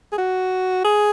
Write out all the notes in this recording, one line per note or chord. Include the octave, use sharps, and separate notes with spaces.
G#4
F#4
G#4